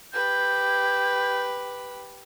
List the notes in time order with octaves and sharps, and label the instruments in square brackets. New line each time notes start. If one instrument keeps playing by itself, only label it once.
[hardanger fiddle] G4 B4 [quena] G6